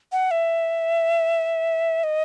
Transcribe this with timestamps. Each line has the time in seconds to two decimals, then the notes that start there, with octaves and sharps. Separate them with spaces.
0.12 F#5
0.31 E5
2.04 D#5